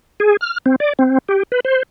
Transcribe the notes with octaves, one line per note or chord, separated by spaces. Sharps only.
G#4
F6
C4
D5
C4
G4
B4
C5